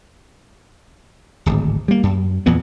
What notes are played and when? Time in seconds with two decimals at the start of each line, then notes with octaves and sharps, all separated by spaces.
1.46 D1 G#1
1.88 G3 A#3
2.03 F#2
2.46 E2 A#2 E3 B3